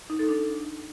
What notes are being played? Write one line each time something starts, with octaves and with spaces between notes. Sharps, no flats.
D#4
A4
D4